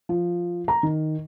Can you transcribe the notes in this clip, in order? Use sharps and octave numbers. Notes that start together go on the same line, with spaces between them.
F3
A#5
D#3